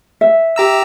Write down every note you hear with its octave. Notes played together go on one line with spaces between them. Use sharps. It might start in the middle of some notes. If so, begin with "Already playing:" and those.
E5
G4 A#5 E6